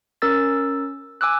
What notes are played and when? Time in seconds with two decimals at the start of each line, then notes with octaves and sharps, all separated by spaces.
0.22 C#4 A#4 E6 A6
1.21 G#5 D6 E6 F#6